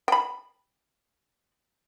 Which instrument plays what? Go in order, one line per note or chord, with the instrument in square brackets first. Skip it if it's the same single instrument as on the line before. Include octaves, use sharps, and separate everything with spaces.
[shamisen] G5 B5